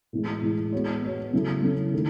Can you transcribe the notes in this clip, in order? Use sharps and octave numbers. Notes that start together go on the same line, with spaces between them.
A2 E3 G#3
A2 E3 G#3
G#3 B3 F#4 C#5
G#3 B3 F#4 C#5
C#3 F#3 C#4 E4 A4
C#3 F#3 C#4 E4 A4
D#3 A3